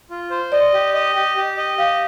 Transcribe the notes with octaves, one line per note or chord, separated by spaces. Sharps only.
F4
C5
D5 D#5
G4
D#5
G4
G4
D#5
G4 F5